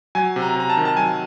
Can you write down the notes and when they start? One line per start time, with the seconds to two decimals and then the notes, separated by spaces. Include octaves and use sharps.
0.15 F#3 G#5
0.36 C3
0.42 A#5
0.56 C3 A#5
0.70 A5
0.77 D#3
0.85 A5
0.97 F#3 G#5